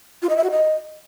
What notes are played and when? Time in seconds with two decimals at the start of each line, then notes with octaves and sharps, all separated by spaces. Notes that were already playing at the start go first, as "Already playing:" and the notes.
0.22 F4
0.29 D#5
0.36 E5
0.43 F#4
0.51 D#5